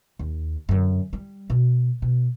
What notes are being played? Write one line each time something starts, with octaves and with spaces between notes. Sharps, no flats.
D#2
F#2 D3
G3
B2
B2